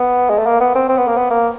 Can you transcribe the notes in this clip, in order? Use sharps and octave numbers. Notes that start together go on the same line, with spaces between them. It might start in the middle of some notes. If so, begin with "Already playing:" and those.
Already playing: B3
G#3
A3
A#3
B3
C4
C4
B3
A#3
B3
A#3